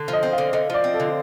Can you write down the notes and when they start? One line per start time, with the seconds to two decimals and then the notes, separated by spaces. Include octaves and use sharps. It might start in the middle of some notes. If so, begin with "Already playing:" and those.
Already playing: D3
0.08 F3
0.13 D#5
0.23 C4
0.33 F5
0.38 D3
0.53 D3 D#5
0.70 F3 D5
0.84 C4
0.94 A4
1.00 D3